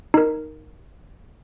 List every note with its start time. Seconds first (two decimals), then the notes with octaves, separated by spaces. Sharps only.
0.14 D#4 A#4